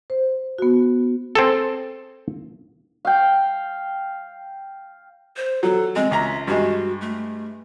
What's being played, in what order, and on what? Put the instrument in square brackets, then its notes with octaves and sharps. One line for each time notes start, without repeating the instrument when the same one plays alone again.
[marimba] C5
B3 F#4
[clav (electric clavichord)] C4 G#4 A4
[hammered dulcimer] F5 G5
[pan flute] C5
[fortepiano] F#3 [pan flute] A4
[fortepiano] G#3 [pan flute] C4
[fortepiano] C#2 A#5 [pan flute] E5
[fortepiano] G2 G#3 [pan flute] F#4
[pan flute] A3